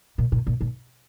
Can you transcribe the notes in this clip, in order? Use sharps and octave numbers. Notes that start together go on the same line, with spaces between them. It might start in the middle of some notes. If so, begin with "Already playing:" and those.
A#2
A#2
A#2
A#2